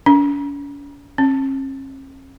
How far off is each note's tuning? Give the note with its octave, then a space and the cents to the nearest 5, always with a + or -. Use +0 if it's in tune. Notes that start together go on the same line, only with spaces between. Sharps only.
C#4 +45
C#4 -45